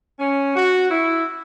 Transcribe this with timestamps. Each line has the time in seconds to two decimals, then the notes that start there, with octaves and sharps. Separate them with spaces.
0.20 C#4
0.55 F#4
0.91 E4